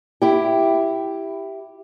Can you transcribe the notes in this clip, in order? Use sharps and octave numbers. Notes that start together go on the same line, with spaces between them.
E4 G4